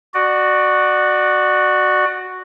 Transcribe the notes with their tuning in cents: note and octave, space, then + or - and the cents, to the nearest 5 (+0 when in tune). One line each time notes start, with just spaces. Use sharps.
F#4 +0 D5 +30